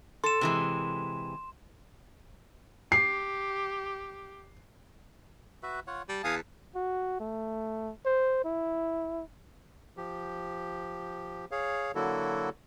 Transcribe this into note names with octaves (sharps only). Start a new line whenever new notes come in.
A4 C6 E7
C3 E3 G#3
G4 C7
F#4 B4 E5
F4 C#5 F#5
G3 A5
E2 F5 G#5 D#6
F#4
A3
C5
E4
F3 G4
G#4 C#5 F5
D3 F#3 A#3 E4 F#4 A4